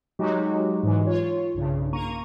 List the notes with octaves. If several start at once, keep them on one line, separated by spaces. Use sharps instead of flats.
F#3 G#3 D#4 F#4 G4
G#2 E3 G#3
F4 C#5
B1 G2 C#3
A#3 A#5 C#6 D#7